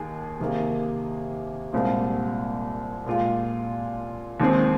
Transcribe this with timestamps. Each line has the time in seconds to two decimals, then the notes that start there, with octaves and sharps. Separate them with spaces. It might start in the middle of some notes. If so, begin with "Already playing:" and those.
Already playing: D#2 D#3 G#4
0.40 C3 D#3 A#3 G#4
1.73 C2 A#2 G#3 C4 F4
3.06 A#2 G#3 F4
4.40 D#2 D#3 G#3 C4 G#4